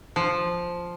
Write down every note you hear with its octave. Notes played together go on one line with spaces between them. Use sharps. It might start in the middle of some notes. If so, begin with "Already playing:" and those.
F3